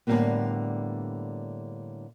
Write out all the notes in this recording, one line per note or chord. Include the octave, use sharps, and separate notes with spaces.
A2 D3 E3 G3 A#3 B3